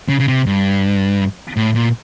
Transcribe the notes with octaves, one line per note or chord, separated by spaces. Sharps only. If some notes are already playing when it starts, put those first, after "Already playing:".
C#3
C#3
C3
G2
A2
A#2